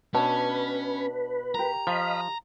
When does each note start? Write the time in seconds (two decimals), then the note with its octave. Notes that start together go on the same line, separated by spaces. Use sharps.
0.15 B2 C#4 D4 B4 C#5 A5
1.55 G4 A#4 A#5
1.87 F3 D#5 F5 B5